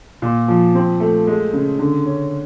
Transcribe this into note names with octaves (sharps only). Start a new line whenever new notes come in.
A#2
F3
C4
A3
G#3
C#3
D3
C#4